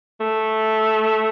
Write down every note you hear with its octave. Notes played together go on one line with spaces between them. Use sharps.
A3